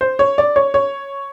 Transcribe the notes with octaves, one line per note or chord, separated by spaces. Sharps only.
C5
C#5
D5
C#5
C#5